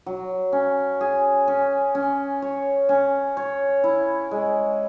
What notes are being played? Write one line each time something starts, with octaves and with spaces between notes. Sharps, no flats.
F#3
C#4
G#4
C#4
C#4
C#5
C#4
C#5
E4
G#3